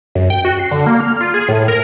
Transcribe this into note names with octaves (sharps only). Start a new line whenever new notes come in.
F#2
G5
F#4
C7
D3
A#3
F6
F4
G#4
A2
A#4